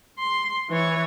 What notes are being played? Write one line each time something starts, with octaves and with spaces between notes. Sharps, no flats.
C6
E3 C#5